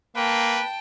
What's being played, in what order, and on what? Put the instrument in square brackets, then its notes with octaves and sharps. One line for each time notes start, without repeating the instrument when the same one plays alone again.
[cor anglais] A#3 [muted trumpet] B4 [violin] G5 A5